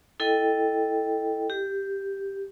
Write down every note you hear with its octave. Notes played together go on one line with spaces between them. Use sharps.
E4 A4 D#5 G5
G4